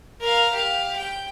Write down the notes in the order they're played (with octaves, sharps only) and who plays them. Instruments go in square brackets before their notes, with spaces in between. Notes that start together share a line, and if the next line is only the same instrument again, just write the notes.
[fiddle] A#4 F5
G4 F5
G5